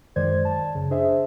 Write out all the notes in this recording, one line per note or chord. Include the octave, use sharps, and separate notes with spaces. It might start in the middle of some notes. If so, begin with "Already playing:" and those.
F#2 D#3 G#3 C5 D5 G#6
A5
F#2 C#3
D4 G#4 C5 D#5 E5